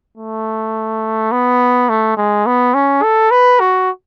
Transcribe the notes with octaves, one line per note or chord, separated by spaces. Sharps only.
A3
B3
A3
G#3
B3
C#4
A4
B4
F#4